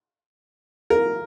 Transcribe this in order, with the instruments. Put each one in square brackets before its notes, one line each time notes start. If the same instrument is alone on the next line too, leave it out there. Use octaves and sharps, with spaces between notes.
[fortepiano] A#4